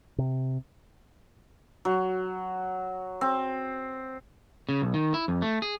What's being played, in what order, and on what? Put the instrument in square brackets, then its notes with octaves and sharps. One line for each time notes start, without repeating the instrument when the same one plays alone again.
[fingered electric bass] C3
[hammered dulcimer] F#3
C4
[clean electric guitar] C#3
B1
D#3
E4
F2
A3
G#4